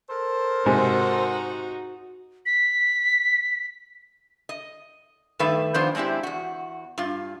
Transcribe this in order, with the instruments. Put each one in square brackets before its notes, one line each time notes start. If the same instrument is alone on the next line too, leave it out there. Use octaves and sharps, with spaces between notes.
[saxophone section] A4 A#4 C5
[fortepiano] G#2 C3 [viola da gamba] D#4 F#4
[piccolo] B6
[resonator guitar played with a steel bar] D#5
G2 D#3 A3 B4 E5
D#3 F3 B3 D4 F4 C5
G#3 C4 D4 E4 G4
E2 F#4
G2 F4